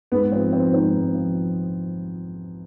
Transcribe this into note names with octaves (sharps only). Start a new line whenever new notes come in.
G#2 B3
F3 C4
F3 C4
G#2 C4 D#4
G#2
F3